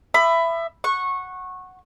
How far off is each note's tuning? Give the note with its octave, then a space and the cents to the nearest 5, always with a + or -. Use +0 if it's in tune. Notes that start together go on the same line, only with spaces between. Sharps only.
E5 +15 B5 +15 D#6 -35
F#5 +0 C#6 -20